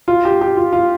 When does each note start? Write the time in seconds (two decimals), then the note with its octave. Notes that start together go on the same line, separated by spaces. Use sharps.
0.08 F4
0.25 G4
0.41 G4
0.57 F4
0.73 F4